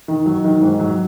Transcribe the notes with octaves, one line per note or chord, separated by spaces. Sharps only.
D#3
F#3
D#3
G#2
F#3